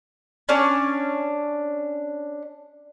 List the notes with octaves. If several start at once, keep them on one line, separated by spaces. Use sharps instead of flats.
C#4 D4